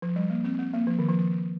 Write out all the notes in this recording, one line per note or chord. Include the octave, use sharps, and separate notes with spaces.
F3
G3
A#3
C4
C4
A#3
F3
D#3
F3